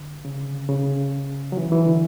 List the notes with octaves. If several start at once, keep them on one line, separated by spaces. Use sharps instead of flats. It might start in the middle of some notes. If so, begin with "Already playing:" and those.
Already playing: D3
C#3
C#3
F#3
E3
E3
D3